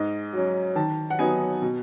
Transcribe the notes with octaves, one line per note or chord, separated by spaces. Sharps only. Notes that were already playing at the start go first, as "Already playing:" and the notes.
Already playing: G#2 D#5
F#3 C#4
D#3 A5
F#5
F#3 B3 D#4 G#5
B2